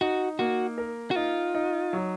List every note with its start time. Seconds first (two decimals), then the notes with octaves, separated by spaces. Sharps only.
0.01 D#4 F#4
0.39 A#3 F#4
0.78 A#4
1.11 F#4
1.16 D#4 F4
1.54 D#4
1.93 F#3